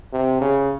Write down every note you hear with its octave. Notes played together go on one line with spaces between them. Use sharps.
C3
C#3